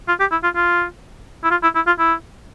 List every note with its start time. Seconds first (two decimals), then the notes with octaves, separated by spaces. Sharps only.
0.08 F4
0.20 G4
0.32 E4
0.44 F4
0.55 F4
1.44 E4
1.51 F4
1.63 E4
1.76 E4
1.87 F4
1.99 E4